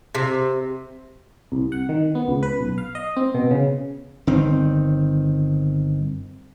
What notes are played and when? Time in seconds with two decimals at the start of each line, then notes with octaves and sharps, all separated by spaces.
0.15 C3
1.52 C2
1.72 F#5
1.89 D#3
2.15 B3
2.28 C#2
2.43 B4
2.60 B1
2.78 F5
2.95 D#5
3.17 C4
3.34 B2
3.51 C#3
4.27 G1 D#3 C4